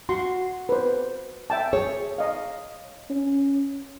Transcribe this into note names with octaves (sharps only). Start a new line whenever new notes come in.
F#4 C6
B4 C5
E5 G5 A5
G#4 C#5
D#5 F5
C#4